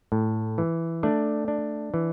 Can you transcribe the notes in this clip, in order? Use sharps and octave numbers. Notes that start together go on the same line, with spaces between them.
A2
E3
A3 D4 D5
D4
E3